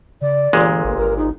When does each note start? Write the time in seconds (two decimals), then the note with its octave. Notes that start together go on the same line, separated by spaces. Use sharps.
0.21 C#3 D5
0.53 G1 A#2 E3 G#3
0.84 G#1 A#3
0.97 G#1 A#4
1.17 D#4